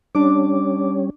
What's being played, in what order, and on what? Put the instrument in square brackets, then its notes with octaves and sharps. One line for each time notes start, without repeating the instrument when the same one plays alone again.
[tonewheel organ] G3 C#4 [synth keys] D4 D6